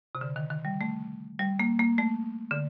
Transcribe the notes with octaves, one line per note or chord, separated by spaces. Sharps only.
C3
D3
D#3
D#3
G3
A3
G3
A#3
A#3
A3
D3